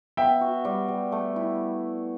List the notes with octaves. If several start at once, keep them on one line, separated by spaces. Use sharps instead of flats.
B3 E5 G5
F#4
G3
G3
A3
E4